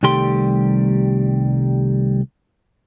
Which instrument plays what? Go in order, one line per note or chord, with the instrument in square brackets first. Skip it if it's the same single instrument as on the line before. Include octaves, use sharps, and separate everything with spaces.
[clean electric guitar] C2 D#3 G3 A3 G4 C6